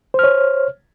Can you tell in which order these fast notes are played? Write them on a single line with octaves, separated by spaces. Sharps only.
C5 F6 C#5